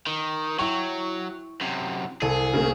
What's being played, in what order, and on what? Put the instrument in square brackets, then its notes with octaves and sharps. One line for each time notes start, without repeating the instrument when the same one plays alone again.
[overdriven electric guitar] D#3
[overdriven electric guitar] F#3 [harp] E4 G5 [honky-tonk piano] C#6
[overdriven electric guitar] F#2 C3
[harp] C2 [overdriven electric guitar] G#4 [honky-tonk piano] A4
[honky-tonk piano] C#3 A3 A#3